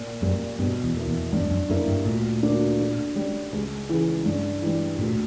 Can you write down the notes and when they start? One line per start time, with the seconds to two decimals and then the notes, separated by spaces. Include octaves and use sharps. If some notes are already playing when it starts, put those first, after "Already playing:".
Already playing: A#2
0.22 F#2 G3 A#3
0.59 G2 B2
0.84 E2
0.96 A#3 E4
1.08 E2
1.32 E2 G2
1.51 F#2
1.69 F#2 D3 A#3 E4
1.88 G2
2.05 D2 A#2
2.42 D3 A#3 D4 F#4
2.79 D3
3.16 G3 C#4
3.52 C#2
3.89 C#3 E3
4.26 G2
4.62 E3 G3
4.99 D2 A#2